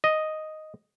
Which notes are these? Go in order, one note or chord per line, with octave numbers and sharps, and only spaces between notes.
D#5